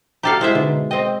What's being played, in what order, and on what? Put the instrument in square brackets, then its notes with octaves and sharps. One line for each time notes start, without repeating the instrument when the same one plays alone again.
[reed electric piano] F#4 G5 A#5 [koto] G4 A4 F5
[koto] G#3 C5 E5 [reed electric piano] E4
[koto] B2 [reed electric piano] D3 D#4
[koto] C4 D#5 [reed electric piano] G5